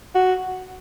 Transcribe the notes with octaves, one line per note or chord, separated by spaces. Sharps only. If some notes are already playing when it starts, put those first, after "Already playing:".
F#4